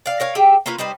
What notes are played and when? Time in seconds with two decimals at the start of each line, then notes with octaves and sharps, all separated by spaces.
0.06 D5 F5
0.20 A#4 C#5 F5
0.35 G4 G#4 E5 G5
0.66 A#3 C#4 F4 B4
0.78 G3 D#4 B4 C5